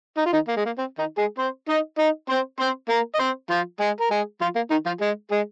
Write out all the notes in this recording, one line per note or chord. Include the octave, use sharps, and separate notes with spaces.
D#4
F4
D#3 D#4
A#3
G#3
A#3
C4
D#3 D#4
G#3 G#4
C4 C5
D#4 D#5
D#4 D#5
C4 C5
C4 C5
A#3 A#4
D#5
C4 C5
F3 F4
G#3 G#4
A#4
G#3 G#4
F3 F4
A#3
D#3 D#4
F3 F4
G#3 G#4
G#3 G#4